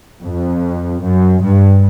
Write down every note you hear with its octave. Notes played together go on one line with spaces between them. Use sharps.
F2
F#2
G2